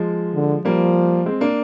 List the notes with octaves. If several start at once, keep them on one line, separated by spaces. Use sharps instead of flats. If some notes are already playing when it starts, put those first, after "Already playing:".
Already playing: F3 G#3
D3
F3 G3 A#3
G#3 C4
A#3 D4